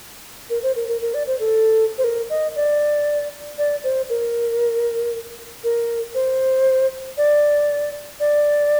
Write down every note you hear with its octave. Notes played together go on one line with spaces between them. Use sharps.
A#4
C5
A#4
A#4
A#4
D5
C5
A4
C5
A#4
D#5
D5
D5
C5
A#4
A#4
C5
D5
D5